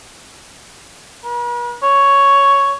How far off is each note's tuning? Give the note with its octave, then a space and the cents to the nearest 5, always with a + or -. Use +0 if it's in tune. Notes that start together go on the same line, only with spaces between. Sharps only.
B4 -45
C#5 +5